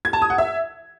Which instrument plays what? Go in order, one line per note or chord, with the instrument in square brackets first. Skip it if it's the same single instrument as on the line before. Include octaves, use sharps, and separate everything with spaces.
[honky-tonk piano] G#6
A5
D#6
F#5
E5